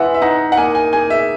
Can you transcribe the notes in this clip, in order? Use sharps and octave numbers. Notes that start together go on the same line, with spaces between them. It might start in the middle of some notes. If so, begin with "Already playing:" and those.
Already playing: E3 G#3 E5 F#5
E5
D#4 F#5
F#5
A#3 G#5
G#5
G#4 G#5
E5